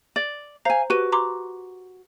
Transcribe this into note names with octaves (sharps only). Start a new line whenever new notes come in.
D5
C5 F5 G#5 A#5
F#4 G4 B4 D#7
A#5 C6 D6